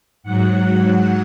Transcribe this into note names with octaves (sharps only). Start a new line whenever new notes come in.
G#2 F#3 F#5
F#5